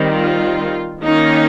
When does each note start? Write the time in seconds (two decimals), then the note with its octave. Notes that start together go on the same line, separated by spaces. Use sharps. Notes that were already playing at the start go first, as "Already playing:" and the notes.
Already playing: D#3 G3 C4
0.13 F4
1.03 D#3 A#3 C#4 D#4